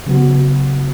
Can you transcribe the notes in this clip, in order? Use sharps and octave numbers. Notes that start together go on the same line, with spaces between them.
C#3 F#3 B3 F#4